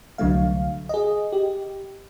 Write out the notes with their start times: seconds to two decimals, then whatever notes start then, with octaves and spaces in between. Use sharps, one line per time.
0.18 C2 D3 F#3 A3 F5
0.89 G#4 D#5
1.32 G4